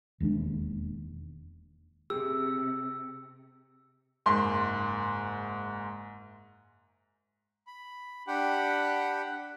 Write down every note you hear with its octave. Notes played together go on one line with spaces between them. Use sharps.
E1 D#2 G#3 D4
C3 G4 G#4 E6
F#1 G#2 C6
B5
D4 G4 F#5 G5 B5